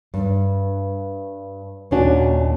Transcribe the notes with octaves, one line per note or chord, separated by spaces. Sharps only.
G2
D#2 A#2 C#4 D4 F#4